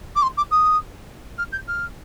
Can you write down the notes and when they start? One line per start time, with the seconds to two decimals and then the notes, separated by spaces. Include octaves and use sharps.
0.15 D6
0.22 C6
0.37 D6
0.51 D#6
1.38 F6
1.52 G6
1.67 F6